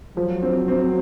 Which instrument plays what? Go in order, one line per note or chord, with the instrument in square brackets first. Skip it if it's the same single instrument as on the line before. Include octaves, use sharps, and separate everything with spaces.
[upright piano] F3 [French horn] F#3
[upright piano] C4
C4